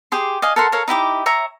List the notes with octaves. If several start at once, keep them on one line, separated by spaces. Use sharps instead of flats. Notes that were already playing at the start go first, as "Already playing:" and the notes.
G4 G#4 C6
D#5 F5 G#5
A4 A#4 F#5 C6
A4 A#4 C#5 F5
D#4 E4 G4 D6
C#5 E5 A#5